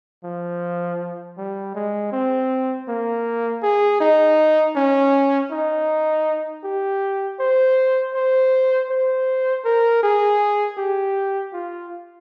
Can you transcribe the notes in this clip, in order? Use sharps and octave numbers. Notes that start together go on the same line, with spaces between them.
F3
G3
G#3
C4
A#3
G#4
D#4
C#4
D#4
G4
C5
C5
C5
A#4
G#4
G4
F4